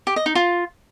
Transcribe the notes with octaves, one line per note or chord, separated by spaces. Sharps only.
G4
D#5
D#4
F4